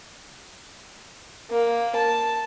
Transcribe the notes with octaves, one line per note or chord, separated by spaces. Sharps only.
A#3
A5